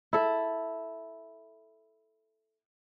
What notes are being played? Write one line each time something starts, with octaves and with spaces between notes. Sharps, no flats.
E4 A4